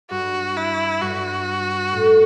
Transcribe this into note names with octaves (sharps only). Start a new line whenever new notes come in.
G2 F#4
E4
G2 F#4
A2